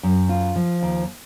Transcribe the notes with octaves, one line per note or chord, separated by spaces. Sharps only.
F#2
F4
F3
D#2